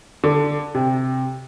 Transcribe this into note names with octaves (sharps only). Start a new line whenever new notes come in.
D3
C3